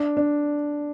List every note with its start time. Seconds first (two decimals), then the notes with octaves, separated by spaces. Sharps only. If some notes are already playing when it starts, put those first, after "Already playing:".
Already playing: D4
0.17 D4